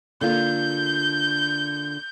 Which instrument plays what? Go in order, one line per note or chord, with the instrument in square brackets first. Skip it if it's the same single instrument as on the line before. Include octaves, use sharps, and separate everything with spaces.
[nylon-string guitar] D3 A#3 F4 [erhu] G6